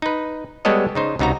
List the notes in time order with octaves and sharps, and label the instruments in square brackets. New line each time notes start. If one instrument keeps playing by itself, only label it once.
[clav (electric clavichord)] D#4 B4
G3 G#3 B3 A4 C#5 D#5
C#3 D#4 C5
C#2 C3 D#4 F#4 A#5